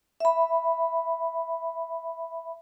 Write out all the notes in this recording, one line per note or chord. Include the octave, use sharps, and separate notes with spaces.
E5 B5